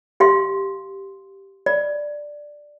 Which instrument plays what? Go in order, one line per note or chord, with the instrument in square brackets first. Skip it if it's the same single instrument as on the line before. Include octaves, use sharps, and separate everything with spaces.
[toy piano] G4 F5 C6
D5